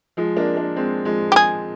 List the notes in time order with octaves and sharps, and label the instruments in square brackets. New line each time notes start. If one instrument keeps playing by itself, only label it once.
[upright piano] F3 G#3
A#3 D4
A#3 D4
G#3 C4
F3 G#3
[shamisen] G4
G#4